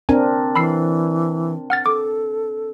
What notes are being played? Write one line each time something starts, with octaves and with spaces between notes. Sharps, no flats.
C4 D4 A#4 G#5
E3 B5 E6 C7
F#5 F6 A6
A4 D6